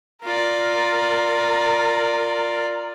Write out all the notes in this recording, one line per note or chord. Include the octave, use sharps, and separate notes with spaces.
F4 A#4 D5